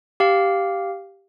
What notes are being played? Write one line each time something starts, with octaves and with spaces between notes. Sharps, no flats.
G4 F5